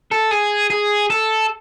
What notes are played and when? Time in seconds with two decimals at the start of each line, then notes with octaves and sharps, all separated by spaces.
0.11 A4
0.31 G#4
0.70 G#4
1.10 A4